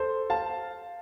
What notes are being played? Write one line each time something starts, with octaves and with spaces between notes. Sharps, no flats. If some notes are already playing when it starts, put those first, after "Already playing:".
Already playing: A4 C5
F5 A5